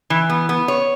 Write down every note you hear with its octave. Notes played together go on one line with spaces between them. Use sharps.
E3
B3
B3
C#5